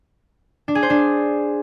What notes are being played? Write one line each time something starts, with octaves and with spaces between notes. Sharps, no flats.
D4
G#4
C5
D4